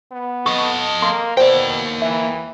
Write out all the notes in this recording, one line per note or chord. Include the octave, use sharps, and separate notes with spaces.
B3
A4 D#5 C#6
A#3 C6
B2 A#3 C5 D5 G5
E3 E5